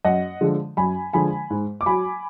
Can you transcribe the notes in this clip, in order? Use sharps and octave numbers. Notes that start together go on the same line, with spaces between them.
F#2 D#5 F#5
D3 F3 G#3
F#2 G#5 B5
D3 F3 G#3 G#5 B5
G#2
D6
F#3 G#5 B5